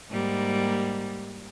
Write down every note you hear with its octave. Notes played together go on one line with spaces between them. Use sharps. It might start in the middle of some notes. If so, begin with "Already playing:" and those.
G#2 G3 A#3